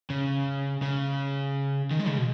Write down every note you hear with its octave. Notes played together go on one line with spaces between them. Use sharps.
C#3
C#3
D#3
G#3
C#3
B2